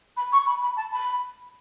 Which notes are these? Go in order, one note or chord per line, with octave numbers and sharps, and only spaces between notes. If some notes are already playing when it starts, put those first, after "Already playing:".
B5
C#6
B5
B5
A5
B5